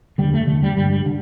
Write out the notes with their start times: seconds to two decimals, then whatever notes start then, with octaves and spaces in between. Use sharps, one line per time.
0.18 E1 D2 D3 G3
0.34 A3
0.47 E1 D2 D3 A3
0.63 G3
0.77 G1 G2 D3 G3
0.91 G3
1.06 D3